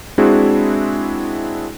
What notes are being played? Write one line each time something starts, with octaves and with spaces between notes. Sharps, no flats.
G#3 C4 D4 E4 F#4 G#4